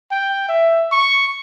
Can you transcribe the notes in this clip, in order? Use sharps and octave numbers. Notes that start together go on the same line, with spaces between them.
G5
E5
C#6